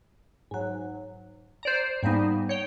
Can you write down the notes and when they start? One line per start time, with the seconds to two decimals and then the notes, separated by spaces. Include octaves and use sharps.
0.51 G#2 F#3
1.63 C5 D5 A#5
2.03 G#2 G3 A#3 B3 D#4
2.49 C#5 G5